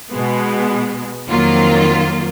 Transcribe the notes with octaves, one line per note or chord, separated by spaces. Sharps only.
B2 G#3 B3
F2 D#3 F#3 A#3 F4